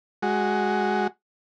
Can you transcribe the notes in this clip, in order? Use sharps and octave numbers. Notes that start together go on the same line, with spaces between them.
G#3 F#4